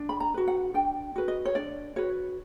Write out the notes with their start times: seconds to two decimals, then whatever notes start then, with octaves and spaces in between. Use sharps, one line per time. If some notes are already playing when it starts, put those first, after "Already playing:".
Already playing: D4
0.09 B5
0.20 A#5
0.34 F#4 B4
0.47 F#5
0.74 D4 G5
1.16 F#4 B4
1.28 D#5
1.45 C#5
1.55 D4 D5
1.96 F#4 B4 C#5